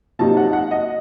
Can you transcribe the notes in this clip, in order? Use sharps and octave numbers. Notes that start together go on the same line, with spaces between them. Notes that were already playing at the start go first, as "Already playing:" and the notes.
C3 F#3 A#3 D#4 A5
F#5
F#5
D#5